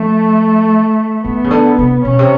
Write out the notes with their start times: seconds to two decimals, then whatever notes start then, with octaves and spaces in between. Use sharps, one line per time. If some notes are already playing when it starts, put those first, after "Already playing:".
Already playing: F3 A3
1.24 E3 B3
1.44 C#3
1.51 D3
1.78 C3
2.05 B2 C#4
2.19 C3